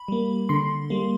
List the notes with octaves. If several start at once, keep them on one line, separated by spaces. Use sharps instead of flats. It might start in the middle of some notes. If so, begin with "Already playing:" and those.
Already playing: B5
G3 A#3
D3 C6
G3 A#3